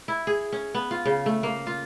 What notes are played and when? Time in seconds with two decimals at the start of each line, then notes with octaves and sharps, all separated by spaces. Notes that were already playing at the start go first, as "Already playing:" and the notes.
0.08 E4
0.27 G#4
0.53 C#4
0.75 B3
0.91 F4
1.06 C#3
1.26 A3
1.43 A#3
1.67 F4